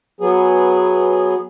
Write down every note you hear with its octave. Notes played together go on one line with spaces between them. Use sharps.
F#3 B3 G#4